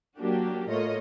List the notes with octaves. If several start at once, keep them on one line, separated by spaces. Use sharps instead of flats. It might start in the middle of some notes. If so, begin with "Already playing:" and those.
F#3 A#3 D4 F#4 G4
A2 A3 A#3 F4 C#5 D#5